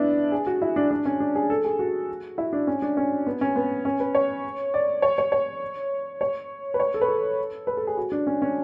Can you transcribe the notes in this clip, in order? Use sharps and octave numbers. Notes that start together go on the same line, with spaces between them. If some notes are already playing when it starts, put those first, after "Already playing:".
Already playing: B3 D4 E4
G#4
F#4
E4
D4
D4
C#4
D4
G#4
A4
G#4
F#4
E4
D4
C#4
D4
C#4
B3
C#4
B3
C#4
B4
C#5
D5
C#5
C#5
C#5
C#5
B4
C#5
A4
B4
A4
B4
A4
G#4
F#4
D4
C#4
C#4